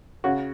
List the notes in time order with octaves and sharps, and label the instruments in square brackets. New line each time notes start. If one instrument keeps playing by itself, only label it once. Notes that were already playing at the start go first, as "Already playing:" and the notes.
[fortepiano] C#3 F#4